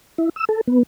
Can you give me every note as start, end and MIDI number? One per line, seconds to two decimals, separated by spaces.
0.18 0.29 64
0.36 0.45 88
0.49 0.61 69
0.67 0.83 59